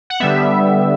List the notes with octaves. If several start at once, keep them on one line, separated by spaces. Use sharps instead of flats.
F#5
D3 G3 B3 E5